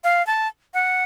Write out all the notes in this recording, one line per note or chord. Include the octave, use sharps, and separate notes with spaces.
F5
A5
F#5